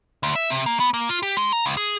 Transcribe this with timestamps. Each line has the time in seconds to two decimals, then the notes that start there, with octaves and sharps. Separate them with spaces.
0.23 D2
0.35 E5
0.50 C3
0.66 A#3
0.80 B3
0.94 A#3
1.09 F4
1.23 G4
1.37 G#3
1.52 A#5
1.66 C#2
1.77 G#4